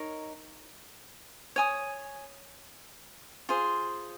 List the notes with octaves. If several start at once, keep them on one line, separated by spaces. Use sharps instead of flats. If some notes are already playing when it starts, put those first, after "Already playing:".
Already playing: D#4 A#4 C#5
C#5 G#5 D#6
F4 G#4 C5